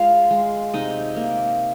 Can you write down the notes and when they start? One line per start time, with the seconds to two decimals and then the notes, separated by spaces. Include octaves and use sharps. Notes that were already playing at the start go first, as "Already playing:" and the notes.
Already playing: G#3 F4 F5
0.30 G#3
0.73 C3 D#4 D#5
1.16 A#3